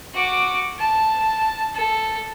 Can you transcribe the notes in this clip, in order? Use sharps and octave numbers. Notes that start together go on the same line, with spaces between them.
F#4 D6
A5
A4